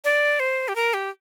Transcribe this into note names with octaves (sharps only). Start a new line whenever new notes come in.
D5
C5
G4
A#4
G4